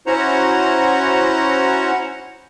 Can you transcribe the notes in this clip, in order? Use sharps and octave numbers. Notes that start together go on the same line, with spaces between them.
C#4 E4 F#4 C5 F#5 A#5